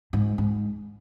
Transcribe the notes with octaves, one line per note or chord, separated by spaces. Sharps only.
G#2
G#2